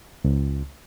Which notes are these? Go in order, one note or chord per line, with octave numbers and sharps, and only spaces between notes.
C#2